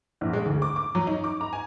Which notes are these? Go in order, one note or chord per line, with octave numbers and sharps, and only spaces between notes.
A#1
G#3
D2
D6
D6
F#3
D#4
D6
A#5
G#5